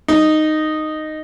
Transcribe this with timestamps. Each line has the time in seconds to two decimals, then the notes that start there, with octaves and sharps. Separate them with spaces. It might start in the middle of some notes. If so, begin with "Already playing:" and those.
0.08 D#4